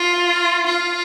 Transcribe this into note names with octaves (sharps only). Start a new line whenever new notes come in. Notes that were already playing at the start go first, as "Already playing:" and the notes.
Already playing: F4
F4